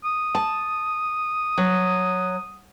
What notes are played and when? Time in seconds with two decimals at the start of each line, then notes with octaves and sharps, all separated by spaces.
0.05 D#6
0.35 A5
1.58 F#3